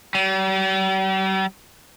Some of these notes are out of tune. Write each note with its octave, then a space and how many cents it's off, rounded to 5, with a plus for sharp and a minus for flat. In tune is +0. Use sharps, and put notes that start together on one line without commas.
G3 -45